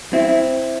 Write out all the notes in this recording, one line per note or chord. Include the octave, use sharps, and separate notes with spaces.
C4 E4
C4 E4